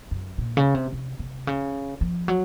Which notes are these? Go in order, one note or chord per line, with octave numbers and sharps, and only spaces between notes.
F#2
A#2
C#3
C3
C3
C3
C#3
F3
F#3